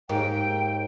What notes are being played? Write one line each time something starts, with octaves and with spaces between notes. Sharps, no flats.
D#2 G#2 G5